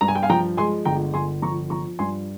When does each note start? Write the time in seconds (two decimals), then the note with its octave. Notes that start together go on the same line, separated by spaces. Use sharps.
0.01 G2 A#5
0.08 G#5
0.15 G5
0.23 F5 G#5
0.30 F3 G5 A#5
0.57 G#3 G#5 C6
0.85 G1 G5 A#5
1.14 G1 G#5 C6
1.42 F3 A#5 C#6
1.70 F3 A#5 C#6
1.99 G2 G#5 C6